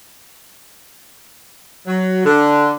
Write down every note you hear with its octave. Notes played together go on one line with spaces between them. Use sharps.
F#3
D3